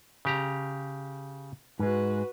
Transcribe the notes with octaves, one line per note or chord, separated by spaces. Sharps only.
C#3 G4 A#5
G#2 G#3 F#4 B4